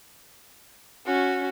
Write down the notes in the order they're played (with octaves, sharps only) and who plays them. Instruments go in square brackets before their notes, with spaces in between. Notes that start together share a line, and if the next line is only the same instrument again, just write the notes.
[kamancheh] C#4 [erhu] F#4